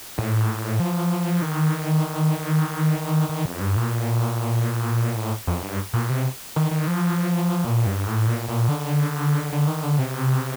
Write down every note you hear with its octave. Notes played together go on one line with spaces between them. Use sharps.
A2
F3
D#3
D#3
F2
G2
A#2
A2
F2
G2
A#2
C3
D#3
D#3
F3
A#2
G2
A2
A#2
A#2
D3
D3
D#3
D3
C3